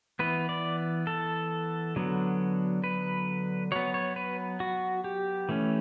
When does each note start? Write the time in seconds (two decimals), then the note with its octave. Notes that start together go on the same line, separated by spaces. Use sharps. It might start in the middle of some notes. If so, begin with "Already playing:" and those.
0.19 E3 B3 B4
0.49 D5
1.07 A4
1.96 D3 F#3 B3
2.84 B4
3.72 F#3 B3 C#5
3.94 C#5
4.16 B4
4.60 F#4
5.04 G4
5.49 E3 A3 C#4